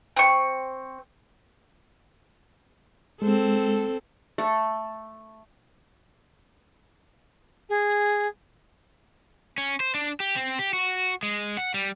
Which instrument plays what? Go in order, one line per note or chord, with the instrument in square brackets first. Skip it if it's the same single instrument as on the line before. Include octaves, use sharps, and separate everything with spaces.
[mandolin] C4 C#6
[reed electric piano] G#3 [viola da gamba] C4 A4
[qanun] A3 A4
[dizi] G#4
[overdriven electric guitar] C#4
C5
D4
G4
C4
G4
F#4
G#3
F#5
G3